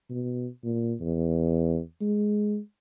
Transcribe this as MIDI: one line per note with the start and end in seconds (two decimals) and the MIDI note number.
0.10 0.47 47
0.64 0.94 46
1.00 1.80 40
2.01 2.58 56